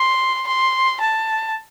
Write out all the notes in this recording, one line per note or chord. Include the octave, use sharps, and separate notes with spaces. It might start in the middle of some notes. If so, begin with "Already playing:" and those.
Already playing: C6
C6
A5